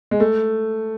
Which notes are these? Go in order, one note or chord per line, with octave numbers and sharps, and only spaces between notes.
G#3
A3